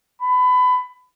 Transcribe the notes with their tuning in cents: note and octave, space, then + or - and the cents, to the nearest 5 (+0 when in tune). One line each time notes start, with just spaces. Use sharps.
B5 +25